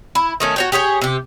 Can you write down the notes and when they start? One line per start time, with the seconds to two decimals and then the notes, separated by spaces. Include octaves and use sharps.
0.15 E4
0.40 D#3 A3 C#4
0.56 F#4 C#5 G5
0.72 G4 G#4 C#5 G5
1.02 C3 G4